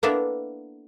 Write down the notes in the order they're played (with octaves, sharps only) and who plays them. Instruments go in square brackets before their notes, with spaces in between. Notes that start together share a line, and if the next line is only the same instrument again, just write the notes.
[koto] A#3 B3 D4 E4 A4 A#4